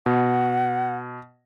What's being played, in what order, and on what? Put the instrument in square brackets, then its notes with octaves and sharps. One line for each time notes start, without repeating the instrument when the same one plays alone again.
[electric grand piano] B2 [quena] F#5